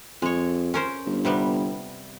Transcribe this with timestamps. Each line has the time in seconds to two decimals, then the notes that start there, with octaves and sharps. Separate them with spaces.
0.22 F2 G#3 C#5
0.74 C#4 A#4 C5
1.06 G1
1.25 C3 G3 B3